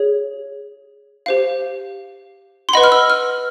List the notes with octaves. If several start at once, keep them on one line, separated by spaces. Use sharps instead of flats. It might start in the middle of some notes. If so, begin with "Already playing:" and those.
Already playing: G#4 C#5
G4 C5 F5
C6
B4 D#5 F#5 B5
F6
E6
F6